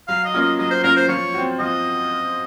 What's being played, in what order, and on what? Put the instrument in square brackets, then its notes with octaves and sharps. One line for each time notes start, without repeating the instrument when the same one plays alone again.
[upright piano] F#3 [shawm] F5
[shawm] D#5
[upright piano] A#3 C#4 F4
[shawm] D#5
[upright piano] F#3 [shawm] D#5
[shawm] C5
[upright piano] A#3 C#4 F4 [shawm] A#4
[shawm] C5
[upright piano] F3 [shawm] C#5
[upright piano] C4 F#4
[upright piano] F3 [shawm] D#5